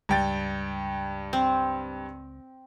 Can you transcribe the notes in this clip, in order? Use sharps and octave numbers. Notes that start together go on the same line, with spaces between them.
C#2 G2 G5 A6
C4